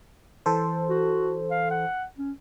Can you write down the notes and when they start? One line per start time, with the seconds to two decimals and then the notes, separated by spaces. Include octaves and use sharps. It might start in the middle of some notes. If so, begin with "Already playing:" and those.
0.46 E3 A4 C5
0.89 F#4
1.51 F5
1.71 F#5
2.18 C#4